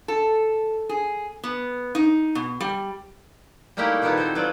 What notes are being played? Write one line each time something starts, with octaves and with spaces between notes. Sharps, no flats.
A4
G#4
B3
D#4
B2
G3
G3 A3 A#3 D#4 E4 G4
A#2 D#3 B3 D#4 E4 A4
C4 C5
F#3 B3 F4 C5 D5